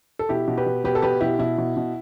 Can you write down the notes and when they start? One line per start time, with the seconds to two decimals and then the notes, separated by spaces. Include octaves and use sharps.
0.19 A4
0.29 B2 E4 G4
0.48 B2
0.57 G4 B4
0.66 B2
0.84 B2 G4 B4
0.95 A4
1.02 B2 G4 B4
1.21 B2 E4 G4
1.39 B2 E4
1.58 B2
1.77 B2